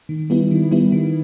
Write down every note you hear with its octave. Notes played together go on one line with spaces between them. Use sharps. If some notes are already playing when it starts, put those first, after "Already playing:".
D#3
G3 B3 E4
D#3
G3 B3 E4
D#3